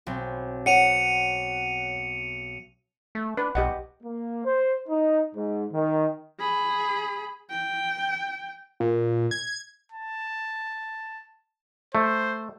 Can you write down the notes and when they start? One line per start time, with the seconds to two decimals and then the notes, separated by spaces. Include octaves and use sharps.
0.07 B1 C4
0.66 C#5 F#5 C#7 D#7 F7
3.15 A3
3.37 D4 B4
3.55 B1 G4 D#5 F#5
4.03 A#3
4.44 C5
4.88 D#4
5.35 G#2
5.71 D#3
6.40 G#4 B5
7.50 G5
8.80 A#2
9.31 G#6
9.92 A5
11.95 A3 C5